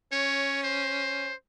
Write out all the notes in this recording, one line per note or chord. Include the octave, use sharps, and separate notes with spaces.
C#4 C#5
C5